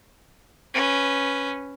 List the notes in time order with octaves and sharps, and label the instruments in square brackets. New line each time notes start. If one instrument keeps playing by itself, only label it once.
[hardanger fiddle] C#4 B4